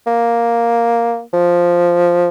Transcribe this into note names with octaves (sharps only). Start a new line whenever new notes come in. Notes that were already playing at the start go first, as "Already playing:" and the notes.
A#3
F3